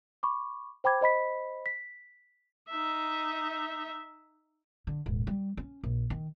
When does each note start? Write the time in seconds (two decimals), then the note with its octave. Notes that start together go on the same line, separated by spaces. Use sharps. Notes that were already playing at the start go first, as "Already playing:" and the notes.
0.23 B5 C#6 D6
0.84 C5 G5 B5 D6 G#6
1.01 C5 D#5 B5 B6
1.66 B6
2.70 D#4 E5
4.87 D3
5.06 D#1 G#2
5.27 G3
5.57 C#4
5.84 A#1
6.10 D#3